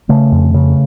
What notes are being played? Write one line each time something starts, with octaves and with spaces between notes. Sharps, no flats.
C#3 A3
F2
C#3